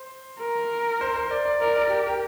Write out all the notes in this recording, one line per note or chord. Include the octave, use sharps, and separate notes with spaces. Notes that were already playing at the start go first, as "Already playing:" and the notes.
Already playing: C5
A#4
C5
C5
D5
D5
A#4 D5
D5
G4 A#4
A#4